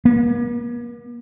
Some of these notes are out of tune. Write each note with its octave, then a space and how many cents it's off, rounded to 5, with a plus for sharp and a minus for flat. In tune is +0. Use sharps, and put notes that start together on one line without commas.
A#3 +45